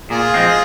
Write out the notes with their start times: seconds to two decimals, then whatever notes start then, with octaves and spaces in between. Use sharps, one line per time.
0.10 A#2 F4 G#4
0.34 F3 G#3 C4